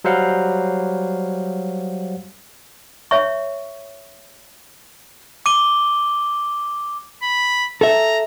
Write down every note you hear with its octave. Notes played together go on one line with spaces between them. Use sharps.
F#3 G3 C5 F5 F#5
C#5 E5 C#6
D6 D#7 G7
B5
A4 E5 A#5